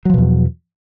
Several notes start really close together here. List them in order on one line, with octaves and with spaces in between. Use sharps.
F#3 F3 B2 E2